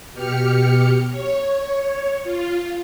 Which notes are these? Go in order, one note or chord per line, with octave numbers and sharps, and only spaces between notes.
B2 G4 F6 C#7
C#5
F4